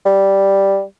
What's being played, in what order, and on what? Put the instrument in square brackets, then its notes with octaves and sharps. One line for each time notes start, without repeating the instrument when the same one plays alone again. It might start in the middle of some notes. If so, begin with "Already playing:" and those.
[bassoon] G3